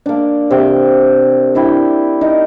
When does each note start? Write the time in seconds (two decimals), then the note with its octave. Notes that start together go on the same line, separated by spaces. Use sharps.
0.06 A#3 D4
0.51 C3 G5
1.55 D4 E4 G5
2.21 D#4 A#4